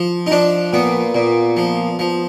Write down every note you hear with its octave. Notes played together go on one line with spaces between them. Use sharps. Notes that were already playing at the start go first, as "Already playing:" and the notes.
Already playing: F3
D#4
F3 D4
A#2 B3
A#2
F3
F3